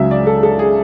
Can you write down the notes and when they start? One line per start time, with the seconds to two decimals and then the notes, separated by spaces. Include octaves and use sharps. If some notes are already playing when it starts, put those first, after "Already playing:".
Already playing: C#2 C#3 F#3 E5
0.11 D5
0.27 A4
0.43 A4
0.59 G#4